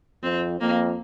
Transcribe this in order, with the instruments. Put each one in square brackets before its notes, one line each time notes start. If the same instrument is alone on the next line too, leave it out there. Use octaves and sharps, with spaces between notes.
[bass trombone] F2 [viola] C4
[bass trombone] F2 [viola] A#3